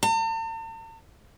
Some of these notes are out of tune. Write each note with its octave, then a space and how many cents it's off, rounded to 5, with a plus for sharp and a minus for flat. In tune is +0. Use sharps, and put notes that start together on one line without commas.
A5 +45